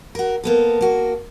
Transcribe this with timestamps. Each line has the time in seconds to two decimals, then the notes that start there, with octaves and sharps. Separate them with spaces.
0.15 F#4 A#4
0.44 A#3 B3 A4
0.81 A#3 F#4